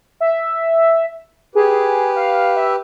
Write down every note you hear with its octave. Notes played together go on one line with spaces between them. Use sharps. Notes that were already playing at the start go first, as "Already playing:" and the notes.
E5
G4 G#4 B4
F5
E5